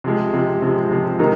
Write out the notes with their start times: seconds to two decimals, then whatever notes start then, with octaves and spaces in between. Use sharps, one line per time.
0.04 C3 F3 G#3
0.34 C3 F3 G#3
0.62 C3 F3 G#3
0.91 C3 F3 G#3
1.19 C3 D#3 A#3 D#4